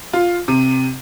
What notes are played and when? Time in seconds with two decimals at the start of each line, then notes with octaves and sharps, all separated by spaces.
0.13 F4
0.48 C3